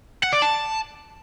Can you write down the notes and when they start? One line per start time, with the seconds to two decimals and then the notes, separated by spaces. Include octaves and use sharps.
0.23 F#5
0.33 D5
0.42 A5